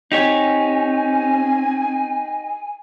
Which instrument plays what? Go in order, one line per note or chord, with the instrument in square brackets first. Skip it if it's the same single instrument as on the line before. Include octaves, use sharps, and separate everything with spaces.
[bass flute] C4 [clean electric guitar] D#4 G4 C#5 [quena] G#5